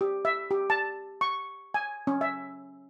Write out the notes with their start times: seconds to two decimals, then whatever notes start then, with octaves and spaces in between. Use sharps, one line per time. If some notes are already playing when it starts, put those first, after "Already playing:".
0.01 G4
0.25 E5
0.51 G4
0.70 A5
1.21 C#6
1.74 G#5
2.07 C#4
2.21 E5